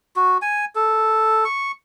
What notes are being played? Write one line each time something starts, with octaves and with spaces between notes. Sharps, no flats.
F#4
G#5
A4
C#6